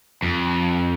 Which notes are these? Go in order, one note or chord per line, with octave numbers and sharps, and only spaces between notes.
F2